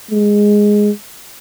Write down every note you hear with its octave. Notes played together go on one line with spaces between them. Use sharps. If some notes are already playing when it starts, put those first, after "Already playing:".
G#3